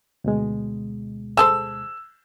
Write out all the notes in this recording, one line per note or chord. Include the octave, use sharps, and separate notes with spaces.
D2 B2 G#3
G#4 A4 C5 E6